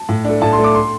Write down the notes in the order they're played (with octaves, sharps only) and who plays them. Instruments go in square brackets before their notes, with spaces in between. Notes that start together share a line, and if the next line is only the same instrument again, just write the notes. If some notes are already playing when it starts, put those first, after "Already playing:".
Already playing: [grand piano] A5
A2
A3 D4
A2 A5
C6
A3 D4
D6
C6